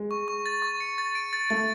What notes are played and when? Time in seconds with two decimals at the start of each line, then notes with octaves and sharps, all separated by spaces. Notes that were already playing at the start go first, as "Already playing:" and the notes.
Already playing: G#3
0.11 C#6
0.28 C#6
0.46 A6
0.62 C#6
0.80 C#7
0.98 A6
1.15 D7
1.33 A6
1.50 A3 A6